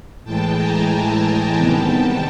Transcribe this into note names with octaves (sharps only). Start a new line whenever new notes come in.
A2 E3 G#3 G5 A5
G#5 A#5
G5 A5
C3 D#3 G3 B3